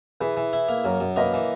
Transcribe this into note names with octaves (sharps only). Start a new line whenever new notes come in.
E3 G#4 B4
E3
E4
A#3
F#2 A#4 C#5
F#2
A#3 B4 D#5
E3